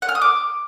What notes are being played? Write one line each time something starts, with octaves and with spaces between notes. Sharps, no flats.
F#5
F6
D#6
D6